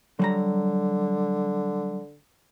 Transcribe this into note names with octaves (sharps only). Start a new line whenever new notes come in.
D3 F#3 G3 A#5